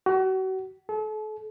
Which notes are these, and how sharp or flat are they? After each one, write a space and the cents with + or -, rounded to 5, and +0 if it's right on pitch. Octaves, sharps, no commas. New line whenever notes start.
F#4 +35
A4 -40